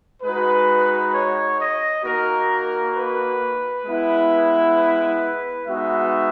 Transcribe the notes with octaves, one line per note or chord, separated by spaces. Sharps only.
G#3 D#4 F#4 B4
C#5
D#5
A#3 D#4 F#4 A#4
B4
G#3 B3 E4
B4
G#3 B3 D#4 F#4 E5